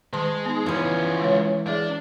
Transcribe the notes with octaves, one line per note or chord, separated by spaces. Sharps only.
D#3 G#3 A5 C6
B3 D#4
E3 F3 C#4 B4
G#3 C#5
D4 G#4 E5